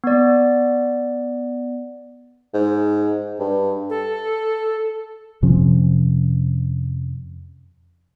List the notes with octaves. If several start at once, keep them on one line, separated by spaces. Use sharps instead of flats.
B3 D5
G#2
G2
A4
F2 C3 F3 C#4